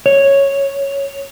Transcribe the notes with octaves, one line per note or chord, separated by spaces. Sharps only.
C#5